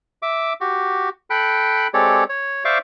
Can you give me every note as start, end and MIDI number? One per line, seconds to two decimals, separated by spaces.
0.22 0.53 76
0.22 0.53 86
0.61 1.09 66
0.61 1.09 67
1.30 1.87 69
1.30 1.87 79
1.30 1.87 83
1.30 1.87 90
1.94 2.24 56
1.94 2.24 60
1.94 2.24 67
1.94 2.24 69
1.94 2.24 73
1.94 2.24 74
2.29 2.64 73
2.65 2.78 72
2.65 2.78 74
2.65 2.78 76
2.65 2.78 77
2.65 2.78 85
2.65 2.78 86